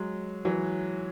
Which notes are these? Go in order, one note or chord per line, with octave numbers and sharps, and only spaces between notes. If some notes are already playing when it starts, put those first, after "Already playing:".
Already playing: F#3 G#3
E3 F#3